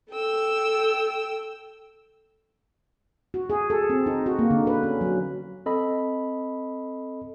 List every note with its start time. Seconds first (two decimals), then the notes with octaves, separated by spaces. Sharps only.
0.11 A4 G5 E6
3.34 F#4
3.50 G#4
3.70 A4
3.90 C4
4.06 D#4
4.26 F#4
4.39 A#3
4.50 D3
4.67 B4
4.83 C#4
5.01 F#3
5.66 C4 A4 D#5 B5